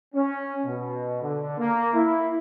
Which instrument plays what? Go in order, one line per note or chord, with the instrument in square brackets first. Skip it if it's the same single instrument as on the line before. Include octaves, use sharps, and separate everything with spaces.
[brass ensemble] C#4
B2
D3
A#3
E4